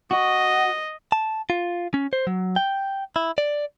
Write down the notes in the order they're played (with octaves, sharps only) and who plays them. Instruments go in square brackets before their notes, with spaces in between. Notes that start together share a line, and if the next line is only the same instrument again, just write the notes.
[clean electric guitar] F#4 [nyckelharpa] D#5
[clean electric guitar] A5
F4
C#4
C5
F#3
G5
E4
D5